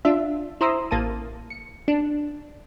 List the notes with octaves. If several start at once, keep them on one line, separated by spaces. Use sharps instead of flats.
D4 F4 E5
E4 C5 A#5 C6 D#6 E6
A1 A#3 A5 D#7
C#7
D4